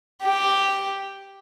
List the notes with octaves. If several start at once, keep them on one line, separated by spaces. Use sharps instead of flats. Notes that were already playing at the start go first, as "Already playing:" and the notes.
G4